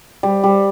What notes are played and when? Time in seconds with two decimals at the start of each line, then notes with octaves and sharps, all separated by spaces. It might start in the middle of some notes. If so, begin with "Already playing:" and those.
0.23 G3
0.44 G3